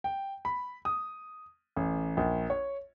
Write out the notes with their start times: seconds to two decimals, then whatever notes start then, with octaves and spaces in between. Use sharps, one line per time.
0.04 G5
0.45 B5
0.85 D#6
1.76 A1
2.17 A#1
2.50 C#5